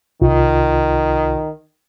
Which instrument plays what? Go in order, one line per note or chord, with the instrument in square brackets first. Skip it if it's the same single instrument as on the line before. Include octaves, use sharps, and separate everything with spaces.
[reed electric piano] C2 F4 [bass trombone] D#3